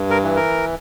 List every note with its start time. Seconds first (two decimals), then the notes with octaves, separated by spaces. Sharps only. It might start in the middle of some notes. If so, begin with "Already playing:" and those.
Already playing: G2
0.10 A#4
0.23 E3
0.36 A#4